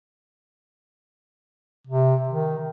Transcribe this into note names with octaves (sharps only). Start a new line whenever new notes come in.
C3
D#3